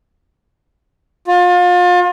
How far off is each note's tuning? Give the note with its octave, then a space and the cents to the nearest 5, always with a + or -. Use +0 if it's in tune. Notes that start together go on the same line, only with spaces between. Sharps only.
F4 +35